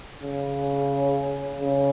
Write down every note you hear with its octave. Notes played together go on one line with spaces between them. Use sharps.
C#3
C#3